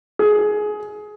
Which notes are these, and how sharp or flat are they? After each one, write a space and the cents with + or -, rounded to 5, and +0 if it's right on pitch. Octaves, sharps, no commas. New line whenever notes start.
G#4 +20